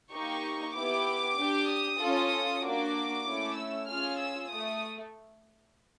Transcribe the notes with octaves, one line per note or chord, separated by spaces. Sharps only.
A#3 D#4 G4 C#6
B3 E4 G4 D6
D4 G4
D#6
C#4 F4 A4
A#3 D4 F#4 D6
A3 C#4 E4
E6
C#4 F4 G#4 F6
E6
A3 D#6